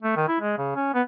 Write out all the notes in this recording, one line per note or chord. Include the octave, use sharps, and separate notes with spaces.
A3
D#3
E4
G#3
C#3
C#4
B3